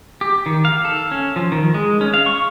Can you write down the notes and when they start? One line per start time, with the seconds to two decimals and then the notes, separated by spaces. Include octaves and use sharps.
0.21 G4
0.46 D#3
0.65 F5
0.85 A4
1.11 C#4
1.36 F3
1.52 D#3
1.74 G#3
2.01 C#4
2.14 F5
2.26 C#6